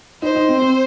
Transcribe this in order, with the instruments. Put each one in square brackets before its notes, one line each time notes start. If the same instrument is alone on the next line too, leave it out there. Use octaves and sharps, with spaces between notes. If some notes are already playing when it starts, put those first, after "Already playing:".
[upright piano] D#4 [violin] C5
[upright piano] D#4
C4
C4